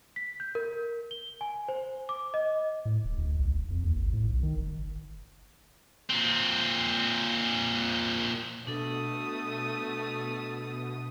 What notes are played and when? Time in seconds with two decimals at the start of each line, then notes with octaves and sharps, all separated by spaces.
0.16 B6
0.40 G6
0.55 A#4
1.11 G7
1.41 G#5
1.69 C5
2.09 D6
2.34 D#5
2.85 A2
3.04 D1
3.18 D2
3.39 B1
3.55 E1
3.70 F2
3.84 D#2
3.96 G#1
4.13 A2
4.29 B1
4.43 D#3
4.57 F#1
6.10 A#2 C4
8.67 B2 A3 D4 A4 D#6